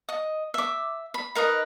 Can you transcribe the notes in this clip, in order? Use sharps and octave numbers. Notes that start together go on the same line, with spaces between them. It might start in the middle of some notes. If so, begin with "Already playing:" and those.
D#5
E5 D6
B5
D#4 A#4 B4 D#5